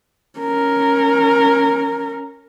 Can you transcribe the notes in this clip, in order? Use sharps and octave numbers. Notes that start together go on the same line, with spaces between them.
C#4 A#4